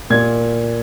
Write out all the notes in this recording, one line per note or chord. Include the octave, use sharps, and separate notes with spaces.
A#2 G#6